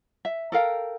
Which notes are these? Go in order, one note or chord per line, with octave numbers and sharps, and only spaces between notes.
E5
A4 A#4 F5 G5